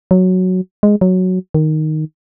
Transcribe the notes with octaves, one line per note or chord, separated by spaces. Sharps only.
F#3
G#3
F#3
D#3